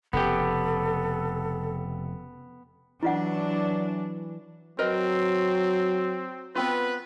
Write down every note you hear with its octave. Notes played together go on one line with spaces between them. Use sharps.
F1 C#3 B3 G4 A4
E3 F#3 D4 E4 F4 F#5
F#3 C4 A#4 B4 D#5
B3 C4 F4 B4